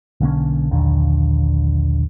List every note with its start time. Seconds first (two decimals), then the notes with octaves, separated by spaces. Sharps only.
0.21 B1 D3 A#3 C#4
0.71 A#1 D#2 D3